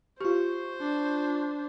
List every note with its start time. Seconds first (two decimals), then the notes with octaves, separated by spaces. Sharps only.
0.21 F4 G4 C5 C#6
0.81 D4